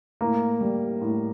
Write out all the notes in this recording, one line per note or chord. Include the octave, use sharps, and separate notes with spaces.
A2 A#3
G3
A2